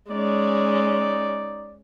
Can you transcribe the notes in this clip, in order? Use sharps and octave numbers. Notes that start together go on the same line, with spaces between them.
G#3 C#4 D#4 D5